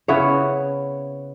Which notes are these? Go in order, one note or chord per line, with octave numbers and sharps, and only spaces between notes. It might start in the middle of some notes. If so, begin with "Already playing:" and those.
C#3 B3 E4 C#5